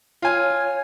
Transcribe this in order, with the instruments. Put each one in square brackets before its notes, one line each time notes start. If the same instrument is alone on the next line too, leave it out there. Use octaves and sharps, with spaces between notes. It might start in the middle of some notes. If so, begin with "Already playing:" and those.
[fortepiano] F4 G#5 [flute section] C#5